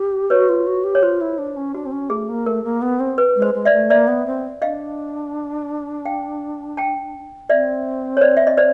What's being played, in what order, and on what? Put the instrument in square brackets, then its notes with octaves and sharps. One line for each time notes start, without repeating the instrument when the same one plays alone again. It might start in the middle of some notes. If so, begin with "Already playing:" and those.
Already playing: [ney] G4
[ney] F#4 [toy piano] B4 C#5
[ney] F4
F#4
G4
[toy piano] C#5
[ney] F4 [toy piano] C5
[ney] E4
D4
C#4
[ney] D4 [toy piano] F#4
[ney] C4
C#4
[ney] A3 [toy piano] G#4
[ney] A#3
[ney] A3 [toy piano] A#4
[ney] A#3
B3
C4
[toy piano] B4
[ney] G#3
[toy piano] C5
[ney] G#3
[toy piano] D5 E5
[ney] A3
[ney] A#3 [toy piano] D5 E5
[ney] B3
C4
[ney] D4 [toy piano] D#5 F5
[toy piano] F5 G5
G5 A5
[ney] C4 [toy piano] D5 E5
[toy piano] C#5
C5 D5
E5
D#5
C5 D5